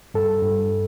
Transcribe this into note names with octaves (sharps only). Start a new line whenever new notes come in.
G2 A4
G2